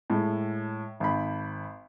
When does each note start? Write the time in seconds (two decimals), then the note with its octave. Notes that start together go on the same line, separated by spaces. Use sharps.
0.10 A2 G#3
1.00 G#1 B5